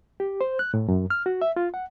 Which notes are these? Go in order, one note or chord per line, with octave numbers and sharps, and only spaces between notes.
G4
C5
F#6
A2
F#2
F6
F#4
E5
F4
F#5